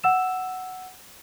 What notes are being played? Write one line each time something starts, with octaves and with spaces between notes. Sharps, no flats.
F#5 E6 E7